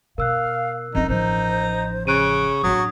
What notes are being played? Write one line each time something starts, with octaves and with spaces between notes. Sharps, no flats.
B2 A#4 F5 E6 F#6
F2 C#4 D#4 D#5
A1 F3 D#4 C5
C#3 C#6 F#6 D7 D#7
A1 F#3 D4 D#6